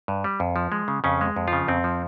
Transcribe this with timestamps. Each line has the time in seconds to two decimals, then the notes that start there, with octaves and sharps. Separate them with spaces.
0.08 G2
0.24 G3
0.40 F2
0.56 F3
0.72 G#3
0.88 C#3
1.04 F2 C#3 C#4
1.21 G#3
1.36 F2
1.48 C#3 F3 F4
1.68 F2 C4
1.84 F3